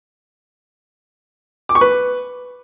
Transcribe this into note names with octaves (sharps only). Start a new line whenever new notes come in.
D6
C#6
B4